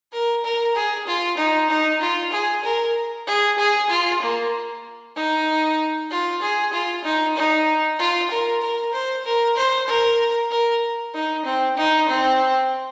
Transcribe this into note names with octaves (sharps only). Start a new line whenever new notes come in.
A#4
A#4
G#4
F4
D#4
D#4
F4
G#4
A#4
G#4
G#4
F4
A#3
D#4
F4
G#4
F4
D#4
D#4
F4
A#4
A#4
C5
A#4
C5
A#4
A#4
D#4
C4
D#4
C4